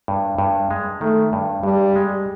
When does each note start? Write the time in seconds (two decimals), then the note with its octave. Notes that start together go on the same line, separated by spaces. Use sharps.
0.08 G2
0.38 G2
0.71 G#3
1.01 D#3 A3
1.33 G2
1.63 G2 G3
1.96 G#3